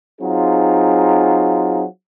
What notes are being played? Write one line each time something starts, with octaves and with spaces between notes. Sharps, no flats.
F#3 C4 D#4 F4 G#4